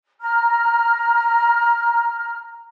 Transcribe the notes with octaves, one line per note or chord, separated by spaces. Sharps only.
A#5 F6